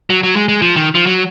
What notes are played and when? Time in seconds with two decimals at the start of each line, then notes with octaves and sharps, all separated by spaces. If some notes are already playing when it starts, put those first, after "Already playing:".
0.10 F#3
0.23 F#3
0.36 G#3
0.49 G#3
0.62 F3
0.76 D#3
0.95 F3
1.06 F#3